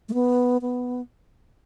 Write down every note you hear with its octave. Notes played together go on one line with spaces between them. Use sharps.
A3
B3
B3